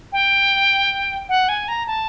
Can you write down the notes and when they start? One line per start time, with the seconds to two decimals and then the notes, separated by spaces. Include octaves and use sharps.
0.13 G5
1.29 F#5
1.49 G#5
1.68 A#5
1.87 A5